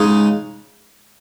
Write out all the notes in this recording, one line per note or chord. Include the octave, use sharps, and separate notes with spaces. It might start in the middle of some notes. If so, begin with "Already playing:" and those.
Already playing: C#3 G#3 D#4